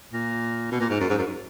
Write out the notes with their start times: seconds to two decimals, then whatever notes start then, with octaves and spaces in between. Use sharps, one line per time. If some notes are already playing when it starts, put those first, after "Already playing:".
0.13 A#2
0.72 B2
0.80 A#2
0.90 G#2
1.00 F#2
1.10 G#2
1.19 F#2